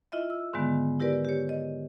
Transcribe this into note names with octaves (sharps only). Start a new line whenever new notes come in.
E4 F4 D#5 E5
E6
G#2 D3 D#3 G#3 B3
E4 G4 A#4 B4 D5
G4 C#5
D#5